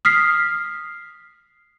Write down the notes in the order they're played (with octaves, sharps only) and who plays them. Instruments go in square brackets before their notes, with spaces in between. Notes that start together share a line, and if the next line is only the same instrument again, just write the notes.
[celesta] D#6 F6 B6 C7